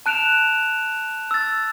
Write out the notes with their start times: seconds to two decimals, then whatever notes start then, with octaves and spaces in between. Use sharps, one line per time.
0.06 A5 F#6 D7 E7 F7
1.31 E6 A6